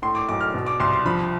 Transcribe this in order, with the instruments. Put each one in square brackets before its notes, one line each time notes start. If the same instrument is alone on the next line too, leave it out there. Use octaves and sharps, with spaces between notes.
[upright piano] A2 [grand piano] C6
[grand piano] D6
[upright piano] B1 [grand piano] D6
[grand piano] F6
[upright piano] B2
[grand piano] D6
[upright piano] C2 [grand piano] C6
[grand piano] C6
[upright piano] F3 [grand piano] B5